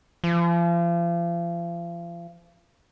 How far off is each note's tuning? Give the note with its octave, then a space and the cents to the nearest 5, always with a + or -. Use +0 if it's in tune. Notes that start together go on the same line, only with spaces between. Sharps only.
F3 -35